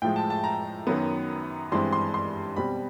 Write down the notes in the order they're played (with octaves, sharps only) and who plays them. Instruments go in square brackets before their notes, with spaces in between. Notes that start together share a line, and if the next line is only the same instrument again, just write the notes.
[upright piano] A2 F3 G#3 G5
A5
A5
A#5
F#2 D#3 F#3 B3
G2 E3 G#3 C4 C6
C6
C6
B2 G3 C4 B5